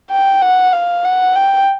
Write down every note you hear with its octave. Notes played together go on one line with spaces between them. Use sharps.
G5
F#5
F5
F#5
G5